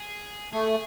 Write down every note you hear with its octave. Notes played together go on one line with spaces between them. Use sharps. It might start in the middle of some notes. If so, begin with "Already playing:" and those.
Already playing: G#4
A3 G#4